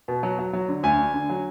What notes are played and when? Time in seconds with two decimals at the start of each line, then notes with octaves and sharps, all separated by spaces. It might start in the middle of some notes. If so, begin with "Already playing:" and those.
0.08 B2
0.23 F#3
0.39 F#3
0.53 F#3
0.69 D3
0.83 D2 G#5
0.98 D3
1.14 D3
1.29 F#3